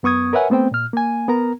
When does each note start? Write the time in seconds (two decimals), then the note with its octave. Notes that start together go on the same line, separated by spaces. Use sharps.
0.03 F#2 B3 C#6 D#6 G#6
0.33 A#4 B4 C#5 E5 F#5 G#5
0.50 A3 B3 C4 C5 G5
0.71 A#2 F6
0.93 A#3 G#5
1.28 B3 A#4 A#5